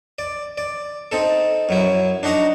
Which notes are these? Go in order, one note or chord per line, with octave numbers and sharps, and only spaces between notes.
D5
D5
C4 D#4 A4
F#2 F#3 E4
D4 D#4 F#4 F#5 A#5